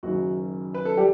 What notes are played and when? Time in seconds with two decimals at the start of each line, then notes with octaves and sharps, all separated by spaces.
0.03 F#1 F#2 D#3 F#4
0.74 B4
0.85 A4
0.97 G3 G4